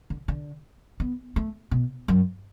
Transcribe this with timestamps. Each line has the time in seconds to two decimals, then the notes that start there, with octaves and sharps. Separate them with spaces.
0.10 D3
0.28 D3
1.00 B3
1.36 A3
1.71 B2
2.08 F#2